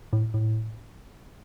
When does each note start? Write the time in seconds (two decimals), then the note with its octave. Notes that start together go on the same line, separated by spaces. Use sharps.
0.13 A2
0.34 A2